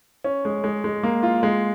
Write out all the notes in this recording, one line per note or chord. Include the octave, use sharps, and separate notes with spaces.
C#4
G#3
G#3
G#3
A#3
F4
G#3